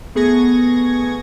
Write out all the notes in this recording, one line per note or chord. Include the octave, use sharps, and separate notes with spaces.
A3 B3 G#4 C#6 G#6 A#6